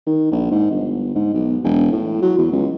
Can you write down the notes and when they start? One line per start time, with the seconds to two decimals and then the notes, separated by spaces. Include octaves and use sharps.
0.06 D#3
0.32 A#1
0.51 G#2
0.71 G1
1.15 G#2
1.34 B1
1.64 E1
1.92 A2
2.22 F#3
2.38 E2
2.52 C#2